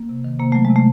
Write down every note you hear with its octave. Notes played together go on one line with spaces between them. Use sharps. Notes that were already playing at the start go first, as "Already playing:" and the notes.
Already playing: A#3
C3
D#3
C3 A#3
F#3 A3
G#3
C3
A3